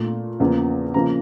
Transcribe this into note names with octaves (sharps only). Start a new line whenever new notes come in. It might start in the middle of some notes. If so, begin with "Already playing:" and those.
Already playing: A#2 A3
E2 C#3 F3 A#3
C#3 F3 A#3 A#5